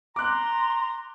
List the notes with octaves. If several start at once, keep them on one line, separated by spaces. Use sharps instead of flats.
A#5 C6 D6 F#6